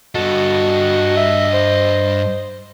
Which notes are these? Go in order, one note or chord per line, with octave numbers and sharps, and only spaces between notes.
G2 F#4 A4 D#5
E5
C5